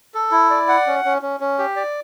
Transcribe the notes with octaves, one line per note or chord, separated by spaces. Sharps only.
A4
E4
D5
F#5
C#4
C#4
C#4
C#4
G4
D5